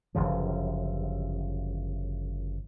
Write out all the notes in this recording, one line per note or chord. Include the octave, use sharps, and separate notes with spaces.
G1 F#2 C#3 F3